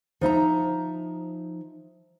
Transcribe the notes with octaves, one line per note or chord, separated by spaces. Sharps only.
F3 D#4 E5 A#5